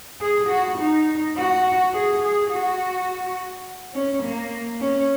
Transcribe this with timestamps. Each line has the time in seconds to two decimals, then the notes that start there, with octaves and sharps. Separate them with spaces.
0.21 G#4
0.49 F#4
0.78 D#4
1.36 F#4
1.94 G#4
2.22 G#4
2.50 F#4
3.94 C#4
4.23 A#3
4.80 C#4